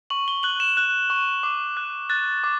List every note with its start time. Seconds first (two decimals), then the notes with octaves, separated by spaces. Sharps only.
0.10 C#6 F#7
0.28 G7
0.43 F#6 F#7
0.60 E7
0.77 F#6
1.10 C#6
1.43 D6
1.77 F#6
2.10 F#6 A6
2.44 D6